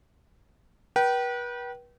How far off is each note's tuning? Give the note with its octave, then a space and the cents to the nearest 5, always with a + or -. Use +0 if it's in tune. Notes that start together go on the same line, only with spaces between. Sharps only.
B4 -35 G5 -30